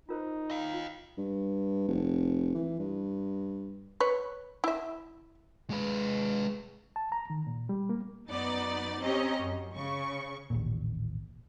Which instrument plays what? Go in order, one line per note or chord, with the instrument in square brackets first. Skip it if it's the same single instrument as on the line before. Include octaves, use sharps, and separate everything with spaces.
[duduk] D#4 [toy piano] F4 A#4 C5
[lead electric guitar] D#5 F5 [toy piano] B5 E6
[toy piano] F4
[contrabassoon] G2
F1
E3
G2
[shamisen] B4 C#5
E4 E5
[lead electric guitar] G#3 B4
[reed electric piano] A5
A#5
D#3
A#2
G3
A#3
[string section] F#2 B3 D#4 D5 A6
C4 C#4 G4 D#5 A#5
F#2
C#3 C#6
[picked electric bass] A1 D#2 A#2